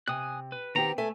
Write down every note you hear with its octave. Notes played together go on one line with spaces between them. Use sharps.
C3 G#5 D#6 F#6
B4
D#3 B3 C4 G4 A#5
A3 A4 E5 G#5